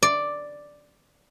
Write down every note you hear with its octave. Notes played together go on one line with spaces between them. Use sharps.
D5